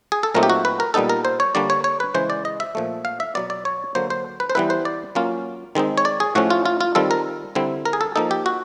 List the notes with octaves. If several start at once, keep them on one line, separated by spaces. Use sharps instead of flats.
G#4
A4
A#2 F#3 A3 C4 D#4 A#4
G4
F#4
B4
A#4
A#2 G3 B3 D#4 A4
A#4
C5
C#5
D3 G3 A#3 D4 D5
C#5
C#5
B4
C#3 E3 G#3 C5
D5
D#5
E5
A#2 F3 A3
F5
E5
B2 F#3 B3 D5
D5
C#5
D3 F#3 A#3 C5
C5
B4
C5
E3 G3 B3 E4 B4
C5
D5
F#3 A#3 C#4 F4
D#3 G#3 C4 D#4
C#5
D5
G#4
A2 F3 A3 C#4 F#4
F4
F4
F4
D#3 G3 C4 F4 A4
A#4
D3 G3 C4 E4
A#4
G#4
A4
F3 A#3 D#4 A4
G4
F#4